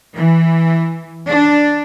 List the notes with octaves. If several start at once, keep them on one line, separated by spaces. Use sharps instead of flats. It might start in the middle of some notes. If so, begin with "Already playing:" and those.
E3
D4